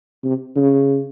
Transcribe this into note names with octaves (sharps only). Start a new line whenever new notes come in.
C3
C#3